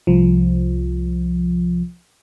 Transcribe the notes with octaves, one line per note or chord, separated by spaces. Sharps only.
C2 F3